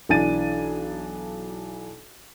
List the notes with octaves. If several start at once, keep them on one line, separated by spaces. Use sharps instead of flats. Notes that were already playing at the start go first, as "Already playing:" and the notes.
B1 E3 D4 G#5 A6 D#7